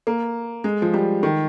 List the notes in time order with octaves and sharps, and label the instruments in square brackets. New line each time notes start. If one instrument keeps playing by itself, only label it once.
[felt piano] A#3
G#3
F3
G3
D#3